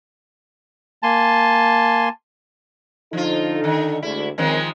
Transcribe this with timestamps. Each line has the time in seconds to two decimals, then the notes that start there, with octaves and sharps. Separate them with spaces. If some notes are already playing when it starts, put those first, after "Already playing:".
1.03 A#3 G#5 A5 C6
3.13 D3 F3 D#4 F4 A4
3.64 D#3
4.02 D2 D3 G#3 E4
4.38 D#3 F3 G#3 C4 C#4 A#4